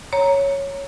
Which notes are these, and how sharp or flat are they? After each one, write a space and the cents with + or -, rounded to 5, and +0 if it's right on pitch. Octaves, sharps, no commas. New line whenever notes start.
C#5 +0 A#5 +0